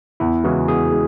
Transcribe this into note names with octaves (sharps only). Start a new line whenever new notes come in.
E2 E4
C#3 E3 G#3 F#4
E2 G#4
G#3